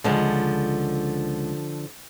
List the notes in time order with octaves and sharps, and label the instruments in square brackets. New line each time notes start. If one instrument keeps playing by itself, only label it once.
[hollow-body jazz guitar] C#2 G#3 [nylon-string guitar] D3 F3